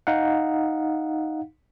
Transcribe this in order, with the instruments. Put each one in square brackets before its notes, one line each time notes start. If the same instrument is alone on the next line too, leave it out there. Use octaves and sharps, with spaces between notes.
[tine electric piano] D#4 F5 F#5